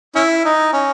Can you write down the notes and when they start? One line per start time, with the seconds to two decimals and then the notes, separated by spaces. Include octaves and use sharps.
0.15 C#4 E4
0.45 D#4
0.73 C#4